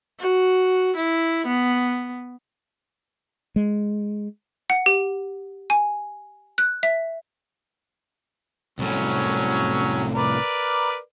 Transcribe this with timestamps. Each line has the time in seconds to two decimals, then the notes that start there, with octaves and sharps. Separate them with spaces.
0.20 F#4
0.96 E4
1.47 B3
3.56 G#3
4.70 F#5
4.86 G4
5.70 G#5
6.58 F#6
6.83 E5
8.79 C2 A2 F#3 C#4
10.15 A#4 B4 D5